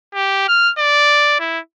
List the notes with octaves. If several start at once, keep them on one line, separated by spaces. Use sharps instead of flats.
G4
F6
D5
E4